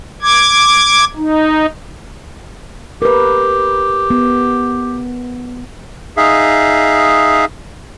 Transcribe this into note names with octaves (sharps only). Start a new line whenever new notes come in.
D6 G#6
D#4
G4 A#4 B4
B3
D#4 G#4 E5 F5